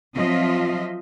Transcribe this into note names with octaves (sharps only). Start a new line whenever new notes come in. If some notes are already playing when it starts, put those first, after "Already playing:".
F3 F#3 C4 F4 D#5 E5